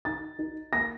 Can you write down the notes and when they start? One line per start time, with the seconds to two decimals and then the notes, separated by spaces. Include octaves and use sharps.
0.05 D#4 A6
0.39 D#4
0.73 A#3 A#6